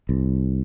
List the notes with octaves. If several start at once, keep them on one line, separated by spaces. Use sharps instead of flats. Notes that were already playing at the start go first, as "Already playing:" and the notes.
C2